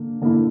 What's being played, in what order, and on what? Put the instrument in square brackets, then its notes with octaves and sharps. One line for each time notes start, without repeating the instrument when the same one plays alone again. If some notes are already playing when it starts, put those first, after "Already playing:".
Already playing: [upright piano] D3 A#3
D3 A#3 E4